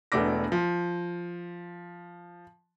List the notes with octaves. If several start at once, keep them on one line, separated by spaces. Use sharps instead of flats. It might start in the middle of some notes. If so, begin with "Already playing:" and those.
E1 B2 A3 D4 D6 A#6
F3